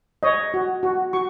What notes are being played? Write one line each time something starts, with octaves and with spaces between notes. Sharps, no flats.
C#5 D#5
F#4
F#4
F#4 C#6